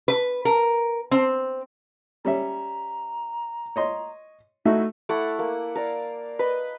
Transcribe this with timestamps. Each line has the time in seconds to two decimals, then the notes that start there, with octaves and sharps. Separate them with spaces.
0.08 B4
0.45 A#4
1.11 C4
2.25 G3 C#4 E5 A#5
3.76 C#5 D#5 C6
4.65 A3 D#4 E4 F#4
5.09 A3 E4 F#5 D6
5.39 A#3
5.75 A#4 D5 F5
6.39 B4 D#5